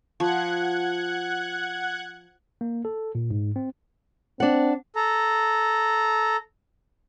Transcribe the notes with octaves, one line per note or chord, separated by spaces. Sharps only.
F3 F#5 F#6 G#6
A#3
A4
A#2
G#2
C4
C4 D4 F#5
A4 A#5